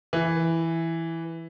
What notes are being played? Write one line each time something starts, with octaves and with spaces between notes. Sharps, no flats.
E3